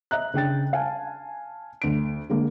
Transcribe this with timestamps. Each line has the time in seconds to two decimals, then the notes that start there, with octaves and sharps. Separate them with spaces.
0.11 D#5 E5 A#5 F#6
0.34 C#3 D4 G5 A6
0.73 F5 G#5 A5
1.82 D2 D7
2.30 D3 G#3 A#3